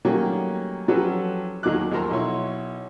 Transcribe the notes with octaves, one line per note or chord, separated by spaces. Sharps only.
D#3 F#3 G3 A3 A#3 C#4
F3 F#3 C#4 G4 A4 B4
D#2 D3 F#3 D#4 D6 F#6
D#2 F3 A4 A#4 A#5 C6
B1 E4 C#5 C6